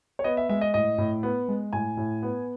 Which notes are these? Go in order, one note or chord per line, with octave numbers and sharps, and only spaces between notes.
C#5
B3 D#5
E5
G#3 E5
D#5
A2 D#5
A2
B3
G#3
A2 G#5
A2
B3